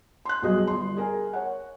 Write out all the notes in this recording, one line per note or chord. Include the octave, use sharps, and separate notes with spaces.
C6 F#6
B1 G2 F#3 G#4 D#5
G1 C6
G#4 A#4 G#5
C#5 F#5